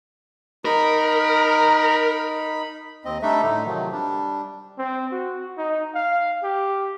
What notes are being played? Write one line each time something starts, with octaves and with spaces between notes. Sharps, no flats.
D#4 A#4 B5
D#2 C4 D#5
G3 A3 D4 D#4 A4 E5
A2 D3 A3 D#4
C3 D#3 F3 F#3
G3 D4
C4
F#4
D#4
F5
G4